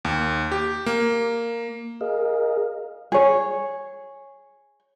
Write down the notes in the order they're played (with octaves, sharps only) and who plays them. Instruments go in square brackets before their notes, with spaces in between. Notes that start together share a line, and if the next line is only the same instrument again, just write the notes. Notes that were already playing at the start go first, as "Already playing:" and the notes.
[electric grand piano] D#2
G4
A#3
[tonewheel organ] G#4 A#4 D#5 F5
[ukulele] G#4 C#5